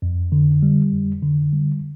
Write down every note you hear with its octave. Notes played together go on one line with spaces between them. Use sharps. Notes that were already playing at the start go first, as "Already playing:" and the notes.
F2
D3
G3
F2
D3
G3